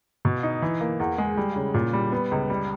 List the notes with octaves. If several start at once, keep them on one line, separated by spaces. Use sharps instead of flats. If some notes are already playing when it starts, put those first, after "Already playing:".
B2
D#4
E3
A#3
E2
G#3
G3
C#3
A#2
G3
B3
C#2
G3